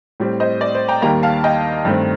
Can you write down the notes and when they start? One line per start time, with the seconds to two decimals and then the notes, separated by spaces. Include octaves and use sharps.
0.20 A2 G3 C4
0.40 C5 D#5
0.61 D5
0.75 C5
0.88 G5 A#5
1.02 D#2 D#3 G3 A#3 G5 A#5
1.23 F5 A5
1.44 D#5 G5
1.85 G2 D#3 A3 C4